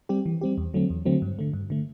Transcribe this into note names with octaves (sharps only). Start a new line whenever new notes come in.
G3 C4 G4
E3
G3 C4 G4
E2
D3 F#3 A3 C4
E2
D3 F#3 A3 C4
G2
D3 A3
G2
D3 A3